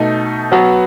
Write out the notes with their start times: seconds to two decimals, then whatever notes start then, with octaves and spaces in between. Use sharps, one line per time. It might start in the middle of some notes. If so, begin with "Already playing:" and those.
Already playing: B2 A3 D#4
0.52 F#3 B3 F#4 B4